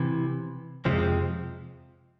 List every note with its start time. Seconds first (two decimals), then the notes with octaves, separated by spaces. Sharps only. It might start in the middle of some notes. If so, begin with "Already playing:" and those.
Already playing: C3 E3
0.85 F2 C3 F3 G#3 C4